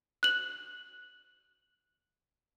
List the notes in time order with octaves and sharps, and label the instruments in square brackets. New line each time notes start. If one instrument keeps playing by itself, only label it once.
[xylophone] F#6 F#7